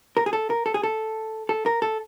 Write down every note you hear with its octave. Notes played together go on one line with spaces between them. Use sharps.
A#4
G#4
A4
A#4
A4
G#4
A4
A4
A#4
A4